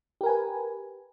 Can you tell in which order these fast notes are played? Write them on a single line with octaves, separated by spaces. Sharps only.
G4 A#4 G#5 B4